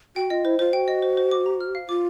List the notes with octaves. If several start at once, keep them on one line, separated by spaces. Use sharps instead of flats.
F#4 G5
F4 D#5
E4 C5
F4 C5
F#4 G5
D#5
C5
C5
D6
A#5
F6
F5
F4 D6